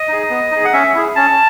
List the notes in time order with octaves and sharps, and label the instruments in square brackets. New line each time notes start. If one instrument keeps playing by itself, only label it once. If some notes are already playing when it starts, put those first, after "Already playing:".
Already playing: [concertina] D#5
D#4 G#4
B3
D#4 G#4
F#5
C#4 E5
E4 G#4
C#4 A5